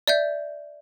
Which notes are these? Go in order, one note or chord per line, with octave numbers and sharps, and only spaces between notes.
D5 E5 G6